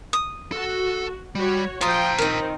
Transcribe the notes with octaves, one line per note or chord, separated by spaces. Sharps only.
D#6
F#4 A4
G3 F#4 C#5
F3 F4 C5 G5 A#5 D#6
D#3 C4 D#4 A#4